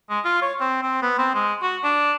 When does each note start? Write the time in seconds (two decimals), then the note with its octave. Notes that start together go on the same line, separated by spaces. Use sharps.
0.10 G#3
0.25 F4
0.42 C#5
0.60 C4
0.83 C4
1.02 B3
1.18 C4
1.35 G#3
1.62 F#4
1.84 D4